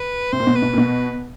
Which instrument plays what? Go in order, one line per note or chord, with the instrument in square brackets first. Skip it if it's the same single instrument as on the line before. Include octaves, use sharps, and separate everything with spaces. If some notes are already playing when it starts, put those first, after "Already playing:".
Already playing: [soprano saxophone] B4
[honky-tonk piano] C3 [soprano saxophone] C5
[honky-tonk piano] A#2
B2
[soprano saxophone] B4
[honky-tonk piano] B2
A#2
B2